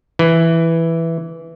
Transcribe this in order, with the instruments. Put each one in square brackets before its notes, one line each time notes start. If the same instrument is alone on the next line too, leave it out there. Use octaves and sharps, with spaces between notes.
[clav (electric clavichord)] E3